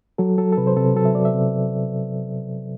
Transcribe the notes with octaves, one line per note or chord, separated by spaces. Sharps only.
F#3 A4
F#3 A4
A4
C3 B4
C5
C3 A4
F#3 A4
E5
F#3 D5
E5
C3